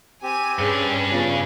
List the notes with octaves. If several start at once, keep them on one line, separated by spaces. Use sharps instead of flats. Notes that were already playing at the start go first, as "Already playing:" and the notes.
C4 G4 G#5 D#7
G2 C#4 D4 G#4 B4 C5 F5
C#3 B3 F4 D5